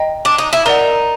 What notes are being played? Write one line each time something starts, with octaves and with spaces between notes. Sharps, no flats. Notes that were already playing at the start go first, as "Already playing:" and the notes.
Already playing: D#5 G5 A#5
D4
D#4
E4
D#4 A#4 D5 F#5